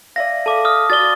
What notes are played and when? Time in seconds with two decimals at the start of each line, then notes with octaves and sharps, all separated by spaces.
0.16 D5 E5 F5 A#6
0.46 A4 F5 A5 D6
0.65 D#6 F6
0.90 F#4 D5 A6 G7